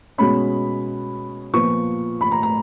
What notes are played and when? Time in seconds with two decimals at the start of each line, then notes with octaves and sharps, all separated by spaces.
0.18 B2 G#3 C#4 B5
1.53 A#2 F3 B3 C#6
2.21 B5
2.32 A#5
2.43 A#5